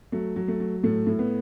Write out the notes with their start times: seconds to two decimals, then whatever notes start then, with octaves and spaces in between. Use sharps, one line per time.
0.12 F#3 A3
0.36 F#3
0.48 A3
0.60 F#3
0.83 A2 A3
1.07 A2
1.19 B3